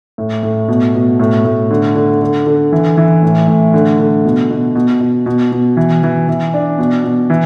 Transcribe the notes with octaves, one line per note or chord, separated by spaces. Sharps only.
A2
A2
B2
B2
A2
A2
D3
D3
D3
D3
E3
E3
A2
A2
D3
D3
B2
B2
B2
B2
B2
B2
E3
E3
E3
D4
B2
B2
E3